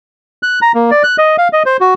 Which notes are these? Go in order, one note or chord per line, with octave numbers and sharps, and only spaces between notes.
F#6
A#5
A#3
D5
F#6
D#5
F5
D#5
C5
F#4